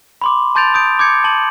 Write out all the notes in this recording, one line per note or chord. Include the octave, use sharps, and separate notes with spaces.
B5 C6 D6
A5 C6 G6 A6 D7 F7
D#6 G6 D7
D6 G6 G#6 C#7
A5 F#7